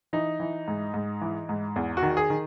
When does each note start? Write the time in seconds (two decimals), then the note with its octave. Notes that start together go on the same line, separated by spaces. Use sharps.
0.13 E3 D#4
0.40 E3
0.68 G#2
0.94 G#2
1.21 E3
1.49 G#2
1.76 E2
1.97 F#4
2.03 D#3
2.17 G#4
2.30 D#3